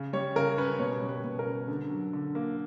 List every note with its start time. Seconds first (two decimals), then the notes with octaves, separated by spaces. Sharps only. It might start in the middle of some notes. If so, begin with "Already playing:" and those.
Already playing: C#3
0.13 G3 C#5
0.36 C#3 A#4
0.57 C#4 B4
0.79 B2 C#5
1.02 G3
1.09 B4
1.24 B2
1.39 A#4
1.47 C#4
1.68 D3
1.90 F#3
2.13 D3
2.35 A#3